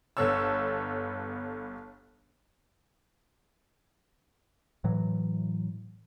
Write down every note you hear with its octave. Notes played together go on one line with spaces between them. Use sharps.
G1 B3 A4 C#5 E6
A2 E3 F#3